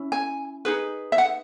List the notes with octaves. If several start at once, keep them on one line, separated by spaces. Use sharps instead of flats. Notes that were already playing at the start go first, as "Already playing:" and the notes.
Already playing: C#4 E4
G#5
D#4 G#4 B4
E5
F#5